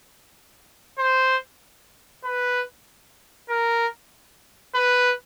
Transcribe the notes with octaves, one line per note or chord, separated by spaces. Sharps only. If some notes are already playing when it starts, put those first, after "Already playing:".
C5
B4
A#4
B4